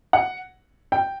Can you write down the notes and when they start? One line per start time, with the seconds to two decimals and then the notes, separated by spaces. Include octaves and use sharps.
0.13 F#5
0.92 G5